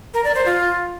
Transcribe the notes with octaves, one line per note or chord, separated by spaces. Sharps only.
A#4
D5
C5
F4